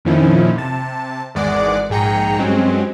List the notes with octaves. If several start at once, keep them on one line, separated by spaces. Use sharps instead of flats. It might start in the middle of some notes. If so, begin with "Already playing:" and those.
F2 A#2 D#3 F3 C#4 E4
C3 A5
G#1 E2 G#3 D5 F#5 D6
A#1 G#2 G#4 G5 A#5 C#7
G2 F#3 G#3 C4 C#4